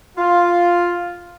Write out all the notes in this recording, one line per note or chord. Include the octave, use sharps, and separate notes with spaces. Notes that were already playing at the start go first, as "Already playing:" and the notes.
F4